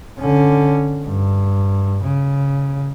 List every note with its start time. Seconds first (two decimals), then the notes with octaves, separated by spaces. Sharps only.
0.19 D3 C#4
1.05 G2
2.03 C#3